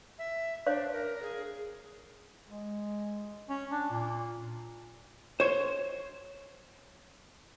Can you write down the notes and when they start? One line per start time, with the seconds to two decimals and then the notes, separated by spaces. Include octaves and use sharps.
0.19 E5
0.67 D4 C5 C#5 F5
0.93 A#4
1.23 G#4
2.50 G#3
3.49 C#4
3.72 D4
3.90 A#2
5.40 C5 C#5